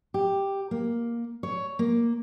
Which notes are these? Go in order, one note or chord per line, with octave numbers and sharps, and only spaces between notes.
G4
A#3
C#5
A#3